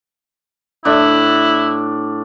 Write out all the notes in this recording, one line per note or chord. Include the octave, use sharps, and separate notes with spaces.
A2 D4 E4